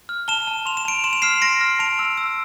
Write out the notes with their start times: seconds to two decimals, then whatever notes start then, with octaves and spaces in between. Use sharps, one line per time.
0.09 F6
0.28 A5 E7 G7
0.47 A5
0.66 C6 F7
0.77 E7
0.85 A5 D7 F7
1.04 C6 E7
1.13 F7
1.22 F6 C7 E7
1.41 C6 A#6 D7
1.61 F6
1.79 A5 D7 F7
1.99 E6
2.18 E6